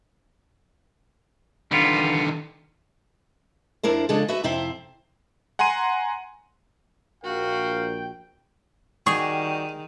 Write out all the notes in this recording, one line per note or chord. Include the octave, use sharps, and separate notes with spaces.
D3 D#3 G3 B3 F4
F2 D4 E4 A#4 C5
C#3 F3 G#3 D4 A4
F#4 B4 E5
F2 C3 C4 E4 C5 E5
F#5 G#5 A#5 C6 D#7
A#1 F#4 A#4 F5 G5
D#3 G3 F#4 G#4 C#6